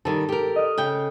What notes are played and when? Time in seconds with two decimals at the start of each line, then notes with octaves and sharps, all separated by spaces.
0.05 D#3 G3 A4
0.29 G4 A#4
0.56 D#5 F6
0.78 C#3 G5